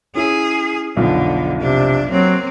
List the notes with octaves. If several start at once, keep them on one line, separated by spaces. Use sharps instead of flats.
C#4 E4 G#4
B1 F2 D3 F4
C3 D4
F#3 A#3 C4